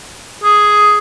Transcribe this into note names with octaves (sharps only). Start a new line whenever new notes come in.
G#4